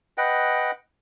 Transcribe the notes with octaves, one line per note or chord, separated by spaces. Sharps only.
B4 D#5 F#5 G5